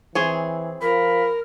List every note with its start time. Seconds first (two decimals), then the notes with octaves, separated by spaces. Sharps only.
0.15 E3 C4 G#4 C#5
0.82 F3 A#4 B5